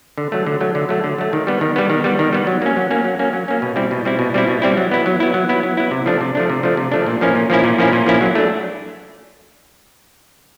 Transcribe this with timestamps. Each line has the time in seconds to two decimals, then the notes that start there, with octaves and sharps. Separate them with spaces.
0.18 D3
0.32 F#3 A3
0.47 D3
0.60 F#3 A3
0.75 D3
0.89 F#3 A3
1.04 D3
1.18 F#3 A3
1.33 D#3
1.47 G3 B3
1.61 D#3
1.76 G3 B3
1.90 D#3
2.04 G3 B3
2.19 D#3
2.33 G3 B3
2.47 F#3
2.62 A#3 C#4
2.77 F#3
2.91 A#3 C#4
3.04 F#3
3.19 A#3 C#4
3.33 F#3
3.48 A#3 C#4
3.62 B2
3.76 G3 C4 E4
3.91 B2
4.05 G3 C4 E4
4.19 B2
4.34 G3 C4 E4
4.48 B2
4.62 G3 C4 E4
4.77 F#3
4.91 B3 E4
5.06 F#3
5.20 B3 E4
5.34 F#3
5.49 B3 E4
5.63 F#3
5.77 B3 E4
5.91 C3
6.06 F3 A3 D4
6.21 C3
6.35 F3 A3 D4
6.50 C3
6.63 F3 A3 D4
6.77 C3
6.92 F3 A3 D4
7.06 A#2
7.21 F3 A#3 C#4 E4
7.35 A#2
7.50 F3 A#3 C#4 E4
7.64 A#2
7.79 F3 A#3 C#4 E4
7.93 A#2
8.06 F3 A#3 C#4 E4
8.21 F#3
8.35 A3 D4